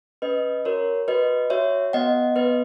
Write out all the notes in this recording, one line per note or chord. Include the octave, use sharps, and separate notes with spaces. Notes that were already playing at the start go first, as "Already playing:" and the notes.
C#4 B4 D#5
F#4 A#4 C#5
F#4 B4 D#5
F#4 C#5 E5
B3 D#5 F#5
B3 B4 D#5